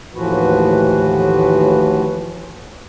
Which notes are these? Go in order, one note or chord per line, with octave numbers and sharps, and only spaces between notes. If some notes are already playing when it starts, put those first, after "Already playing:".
D#2 A2 E3 F3 F#4 B4